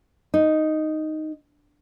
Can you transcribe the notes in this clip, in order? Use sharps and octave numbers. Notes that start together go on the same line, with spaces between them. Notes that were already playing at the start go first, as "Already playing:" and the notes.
D#4